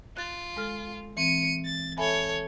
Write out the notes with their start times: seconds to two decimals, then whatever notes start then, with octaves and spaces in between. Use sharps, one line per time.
0.17 F4 F#6 A6
0.56 G#3 A4 F6
1.17 E3 C4 C#7 D#7
1.65 A6
1.98 A4 C#5 E5 G#5 B5